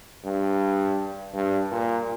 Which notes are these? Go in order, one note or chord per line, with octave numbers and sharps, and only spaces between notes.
G2
G2
A#2